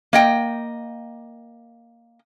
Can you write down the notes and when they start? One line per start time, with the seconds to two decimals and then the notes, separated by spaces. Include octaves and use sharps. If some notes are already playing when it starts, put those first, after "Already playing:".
0.13 A#3 D#5 G5